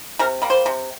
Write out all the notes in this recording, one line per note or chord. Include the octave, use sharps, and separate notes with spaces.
C3 A#4
G3 A#3
C5
C3